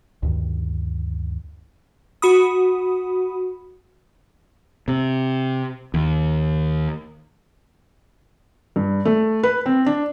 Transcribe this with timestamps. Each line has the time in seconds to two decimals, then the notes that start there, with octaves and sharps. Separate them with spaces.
0.23 D2 G2 D#3
2.22 F#4 B5 D#6
4.88 C3
5.94 D#2
8.76 G2
9.05 A3
9.43 B4
9.66 C4
9.86 D4